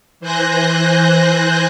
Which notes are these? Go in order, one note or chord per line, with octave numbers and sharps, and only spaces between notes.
E3 C5 G#5 F#6 G6 A#6